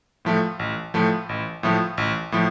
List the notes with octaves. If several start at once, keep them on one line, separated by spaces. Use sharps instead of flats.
A2 F3 A3
A1
A2 F3 A3
A1
A2 F3 A3
A1
A2 F3